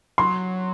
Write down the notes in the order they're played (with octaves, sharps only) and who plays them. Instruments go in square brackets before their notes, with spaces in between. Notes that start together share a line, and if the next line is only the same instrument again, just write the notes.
[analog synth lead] F#3 [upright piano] C6